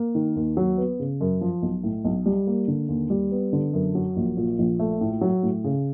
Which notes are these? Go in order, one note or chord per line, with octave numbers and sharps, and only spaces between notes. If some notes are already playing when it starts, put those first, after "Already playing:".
Already playing: A#3
D#3
D#2
F#3
B3
C#3
F#2
F3
B1
A2
B1
G3
A#3
D3
D#2
G3
B3
D3
F#2
F#3
A#1
A#2
A#1
A3
A2
F#3
A2
C#3